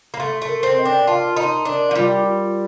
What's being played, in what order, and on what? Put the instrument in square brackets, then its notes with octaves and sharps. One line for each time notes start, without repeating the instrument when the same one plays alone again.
[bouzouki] A#3
[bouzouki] A3 [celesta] C6
[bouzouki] A3
[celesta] A#4
[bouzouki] C4
[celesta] D#5
[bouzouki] D4
[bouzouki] F4 [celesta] A5
[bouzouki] D#4 [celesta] C6
[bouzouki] D4 [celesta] A#4
[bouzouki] F3
[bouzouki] G3 [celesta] F4
[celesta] F4